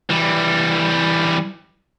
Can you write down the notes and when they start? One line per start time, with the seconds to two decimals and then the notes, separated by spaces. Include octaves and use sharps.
0.10 E3 G3